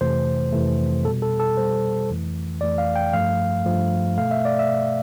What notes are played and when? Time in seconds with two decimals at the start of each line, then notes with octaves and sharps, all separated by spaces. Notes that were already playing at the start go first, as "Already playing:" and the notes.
0.01 F2 C3 E3 A3 C5
0.53 F2 C3 E3 A3
1.05 B2 G3 A4
1.22 A4
1.40 A4
1.57 B2 G3 C5
2.09 F2 E3 A3
2.61 F2 E3 A3 D5
2.78 F5
2.96 G5
3.13 G2 F3 A3 F5
3.65 G2 F3 A3
4.17 B2 A3 F5
4.31 E5
4.45 D5
4.59 E5
4.69 B2 A3